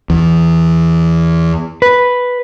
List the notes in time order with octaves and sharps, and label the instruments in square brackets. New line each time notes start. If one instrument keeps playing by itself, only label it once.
[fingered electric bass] E2
[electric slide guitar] B4